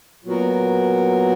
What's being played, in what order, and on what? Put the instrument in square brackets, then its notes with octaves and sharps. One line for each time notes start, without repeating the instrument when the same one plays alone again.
[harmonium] A#2 F#3 B3 F#4 A#4